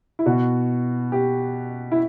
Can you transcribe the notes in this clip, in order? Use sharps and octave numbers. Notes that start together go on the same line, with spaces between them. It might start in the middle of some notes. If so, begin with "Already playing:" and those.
E4
B2 F#4
G4
E4